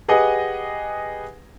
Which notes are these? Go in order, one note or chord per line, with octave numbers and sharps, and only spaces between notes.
G4 G#4 B4 D#5 F#5